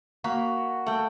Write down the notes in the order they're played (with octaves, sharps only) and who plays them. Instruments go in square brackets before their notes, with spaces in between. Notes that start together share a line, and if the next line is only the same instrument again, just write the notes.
[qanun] A#3 B5 [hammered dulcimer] F#4
[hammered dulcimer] A3 [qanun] F#5 G5